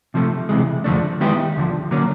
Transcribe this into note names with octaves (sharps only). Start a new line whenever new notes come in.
C3 F3 A3
C2 C3 E3 G#3
F2 D3 F3 A3 D4
D#3 G#3 B3 E4 G4
D2 D3 F3
D3 F#3 A#3 C#4